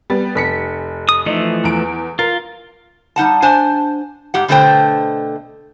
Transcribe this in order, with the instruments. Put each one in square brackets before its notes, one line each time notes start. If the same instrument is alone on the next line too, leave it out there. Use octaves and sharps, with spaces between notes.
[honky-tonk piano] G3 B3 A6
F1 B6 C#7
[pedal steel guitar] D#6
[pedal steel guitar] E3 F3 A3 [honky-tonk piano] D#4
[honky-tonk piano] E2 D7
[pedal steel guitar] F4 [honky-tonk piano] A#4
[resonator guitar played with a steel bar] G3 D#4 F#5 A5
D4 C5 G#5 A5
G#2 G4 F#5
B2 D3 A3 A#4 C5 G5